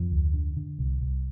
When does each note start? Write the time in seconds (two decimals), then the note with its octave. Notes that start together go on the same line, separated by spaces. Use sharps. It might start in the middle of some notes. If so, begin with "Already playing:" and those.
Already playing: F2 F3
0.12 D2
0.34 D3
0.57 D3
0.79 C2
1.01 C2